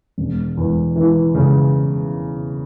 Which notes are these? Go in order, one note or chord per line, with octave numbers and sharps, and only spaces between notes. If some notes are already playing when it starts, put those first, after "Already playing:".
E1
E2
E3
C#3